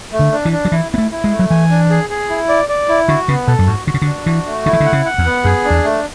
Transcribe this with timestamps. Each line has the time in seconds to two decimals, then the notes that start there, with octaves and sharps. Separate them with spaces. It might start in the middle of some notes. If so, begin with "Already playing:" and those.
0.13 A3
0.19 D3
0.32 D4
0.45 E3
0.52 D4
0.65 F#3
0.72 E3 E4
0.92 B3 E4
0.98 A3
1.11 E4
1.24 G#3
1.31 A3
1.39 F#3
1.50 E3 G#5
1.70 D4
1.90 G#4
2.10 G#4
2.30 E4
2.49 D5
2.69 D5
2.89 E4
3.08 D3 F#4
3.28 C#3 B3
3.47 B2 A4
3.59 F#2
3.67 G#2 F#4
3.87 D3 F#4
3.94 C#3
4.02 D3
4.06 D4
4.26 E3 F#4
4.46 A3
4.66 D3 E4
4.73 E3
4.80 D3
4.85 F#5
4.93 C#3
5.05 F#5
5.18 E2
5.25 B3
5.45 F#2 G#4
5.64 D4
5.70 E2
5.84 A3